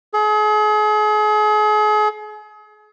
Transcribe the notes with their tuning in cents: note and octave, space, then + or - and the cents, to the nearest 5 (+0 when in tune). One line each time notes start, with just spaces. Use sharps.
G#4 +40